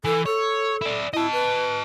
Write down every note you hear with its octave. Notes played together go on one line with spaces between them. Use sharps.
E3 A4
A4 C#5
E4 D5
E4 D#5 A5
B4